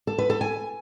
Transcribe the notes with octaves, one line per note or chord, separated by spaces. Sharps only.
A4
B4
A4
G#5